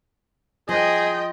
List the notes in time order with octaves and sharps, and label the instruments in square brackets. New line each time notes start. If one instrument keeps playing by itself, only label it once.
[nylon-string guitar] F3 [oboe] G#4 [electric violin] D#5 G5